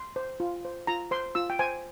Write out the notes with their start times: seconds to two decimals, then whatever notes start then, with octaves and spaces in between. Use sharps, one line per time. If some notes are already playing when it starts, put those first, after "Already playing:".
Already playing: C6
0.16 C5
0.40 F4
0.65 C5
0.87 F4 A#5
1.11 C5 C6
1.35 F4 E6
1.50 G5
1.59 C5 G#5